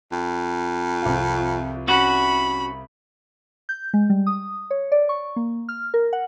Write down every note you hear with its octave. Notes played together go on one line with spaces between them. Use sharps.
F2
C2 C4 F4
C#4 F#4 B5
G6
G#3
G3
D#6
C#5
D5
C#6
A#3
F6
A#4
F#5